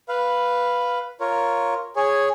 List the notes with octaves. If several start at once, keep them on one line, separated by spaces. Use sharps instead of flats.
B4 F5
F4 A#4 C#5
G#4 C#5